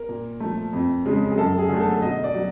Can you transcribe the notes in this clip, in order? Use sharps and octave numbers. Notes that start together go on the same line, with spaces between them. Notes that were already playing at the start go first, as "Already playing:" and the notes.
Already playing: A#4
A#2
F3 A3
F2
C#3 F3 G#3
G#4
F#2 A4
G#4
D3 F#3 A3
A4
B2 D#5
D5
F#3